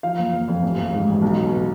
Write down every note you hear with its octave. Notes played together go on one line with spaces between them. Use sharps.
F3 F5
F#1
F#1
F2
A1
A1
G#2
A1
B1
B2
B2